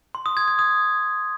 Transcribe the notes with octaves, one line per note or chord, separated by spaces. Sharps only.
C6
D#6
G#6
G#6
D#6